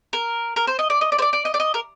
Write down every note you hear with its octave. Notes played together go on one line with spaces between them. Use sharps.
A#4
A#4
C5
D#5
D5
D#5
D5
C5
D5
D5
D#5
D5
D#5
A#4